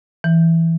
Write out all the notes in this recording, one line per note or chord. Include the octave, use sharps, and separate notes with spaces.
E3